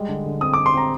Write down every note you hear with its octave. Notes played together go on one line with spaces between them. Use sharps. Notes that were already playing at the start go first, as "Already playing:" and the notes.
Already playing: G3 G#3
D3
D3
C4 D#6
C4 D6
C6
C4 A#5